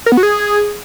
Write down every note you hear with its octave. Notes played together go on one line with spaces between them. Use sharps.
A#4
B3
F#4
G#4